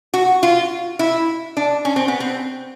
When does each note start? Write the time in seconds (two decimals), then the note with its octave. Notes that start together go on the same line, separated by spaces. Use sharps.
0.14 F#4
0.43 F4
0.99 E4
1.57 D4
1.85 C#4
1.96 C4
2.08 B3
2.20 C4